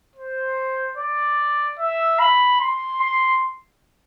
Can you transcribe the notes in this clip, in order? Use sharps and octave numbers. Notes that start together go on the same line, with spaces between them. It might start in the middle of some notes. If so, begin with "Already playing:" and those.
C5
D5
E5
B5
C6
C6